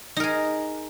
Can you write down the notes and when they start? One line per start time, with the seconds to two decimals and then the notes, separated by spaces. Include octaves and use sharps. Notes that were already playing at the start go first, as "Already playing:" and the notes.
0.17 D#4
0.20 A#4
0.24 G#4